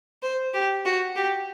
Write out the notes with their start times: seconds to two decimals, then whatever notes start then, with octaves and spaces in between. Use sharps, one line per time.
0.23 C5
0.54 G4
0.85 F#4
1.16 G4